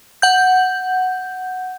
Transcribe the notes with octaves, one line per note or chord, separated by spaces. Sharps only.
F#5 G6